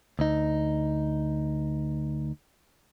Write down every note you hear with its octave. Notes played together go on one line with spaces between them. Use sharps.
D2 D#4